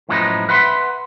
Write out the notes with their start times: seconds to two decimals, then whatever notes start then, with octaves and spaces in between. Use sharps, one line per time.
0.09 F#2 A2 F3 G#3 D#4 B4
0.49 B4 E5 F#5 B5 C6